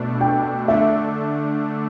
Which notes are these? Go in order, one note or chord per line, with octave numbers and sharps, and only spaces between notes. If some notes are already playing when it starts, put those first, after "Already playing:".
Already playing: B2 A3 D4
G5
D3 A3 D4 E5